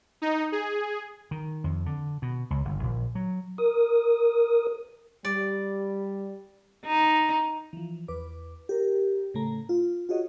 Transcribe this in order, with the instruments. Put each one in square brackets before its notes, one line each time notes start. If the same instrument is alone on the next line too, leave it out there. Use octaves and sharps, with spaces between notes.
[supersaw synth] D#4
G#4
[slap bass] D#3
F2
D3
B2
C#2
G1
A#1
F#3
[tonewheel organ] A#4 D#6
[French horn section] G3 [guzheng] D5
[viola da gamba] D#4
[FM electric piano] E3 F3
E2 B4 D6
G4 A#4
A2 C#3 A3 A#5
F4
F4 F#4 G#4 C#5 D#5